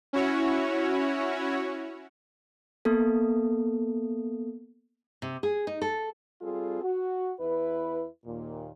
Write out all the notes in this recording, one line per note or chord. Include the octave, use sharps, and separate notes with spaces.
C#4 E4 F#4 C#5
A#3 B3 A4
C3
G#4
D#4
A4
G3 C4 F4 G#4 A4
F#4
E2 E4 B4
D#2 A#2